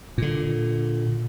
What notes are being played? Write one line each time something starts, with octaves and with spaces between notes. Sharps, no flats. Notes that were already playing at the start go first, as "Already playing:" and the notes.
A#2 D3